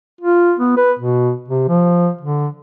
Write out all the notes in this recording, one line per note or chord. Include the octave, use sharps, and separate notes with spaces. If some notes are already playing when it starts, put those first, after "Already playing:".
F4
B3
B4
B2
C3
F3
D3